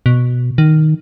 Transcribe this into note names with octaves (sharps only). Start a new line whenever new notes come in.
B2
D#3